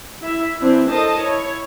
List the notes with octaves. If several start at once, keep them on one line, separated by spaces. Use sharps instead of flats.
E4 E5
E3 C4 D4 E4
A4 A#4 C5 D#5 A5
E4 C#5